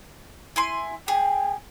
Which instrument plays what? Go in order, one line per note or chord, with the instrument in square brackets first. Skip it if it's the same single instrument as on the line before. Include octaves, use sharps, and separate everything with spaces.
[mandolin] E4 G#5 C6
[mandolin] G#4 [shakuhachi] G5